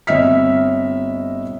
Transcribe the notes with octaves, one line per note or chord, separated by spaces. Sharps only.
G1 C4 D#5 E5 F6 B6